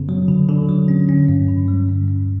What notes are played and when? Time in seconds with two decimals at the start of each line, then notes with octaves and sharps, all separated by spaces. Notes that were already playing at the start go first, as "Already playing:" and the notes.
Already playing: F#2 C#3 B3
0.09 F#3
0.28 D3
0.49 D3
0.69 F#3
0.88 C#4
1.09 C#4
1.28 G2
1.48 D3
1.68 G3
1.88 G2
2.08 G2